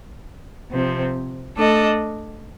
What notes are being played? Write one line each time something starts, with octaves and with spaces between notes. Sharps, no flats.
C3 F3 C4
A3 D4 A4 D#5